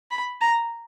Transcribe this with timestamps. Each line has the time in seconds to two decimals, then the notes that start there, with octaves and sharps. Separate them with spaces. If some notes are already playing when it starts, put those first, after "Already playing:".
0.11 B5
0.41 A#5